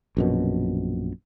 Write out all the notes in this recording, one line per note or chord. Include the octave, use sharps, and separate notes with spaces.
A#1 F#2 B2